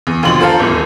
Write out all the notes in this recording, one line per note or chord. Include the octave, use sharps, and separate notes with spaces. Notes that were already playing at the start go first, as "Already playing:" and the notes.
E2
D#2 B2 D3 F3 C6 F#7
F4 A4 C5 F5 A5 A#5
D#1 A1 E2